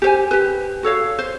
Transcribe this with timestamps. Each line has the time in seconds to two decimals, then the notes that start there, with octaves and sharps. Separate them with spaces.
0.02 G4 C5 G#5
0.31 G4 B4
0.83 F#4 A4 C#5 F5
1.19 C5